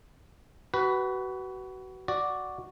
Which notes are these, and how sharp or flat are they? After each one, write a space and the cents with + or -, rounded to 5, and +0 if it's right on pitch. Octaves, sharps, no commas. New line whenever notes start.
F#4 +30 B4 +0
F#4 +0 D5 +0